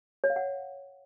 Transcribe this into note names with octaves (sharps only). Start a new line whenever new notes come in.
C#5
F5
F#5